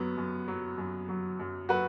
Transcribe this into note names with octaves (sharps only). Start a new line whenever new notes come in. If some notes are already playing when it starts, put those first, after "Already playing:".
Already playing: F#2 F#3 B3
F#2
F#3
F#2
F#3
F#2
F#3 F#4 B4